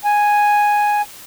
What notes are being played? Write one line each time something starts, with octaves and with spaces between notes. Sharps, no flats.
G#5